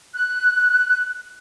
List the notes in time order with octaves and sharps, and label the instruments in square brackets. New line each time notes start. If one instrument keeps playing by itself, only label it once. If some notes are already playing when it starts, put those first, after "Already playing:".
[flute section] F#6